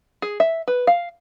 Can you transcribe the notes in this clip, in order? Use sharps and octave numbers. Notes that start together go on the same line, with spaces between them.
G#4
E5
B4
F5